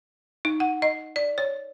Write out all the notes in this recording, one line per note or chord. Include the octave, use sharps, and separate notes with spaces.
D#4
F#5
D#5
D5
C#5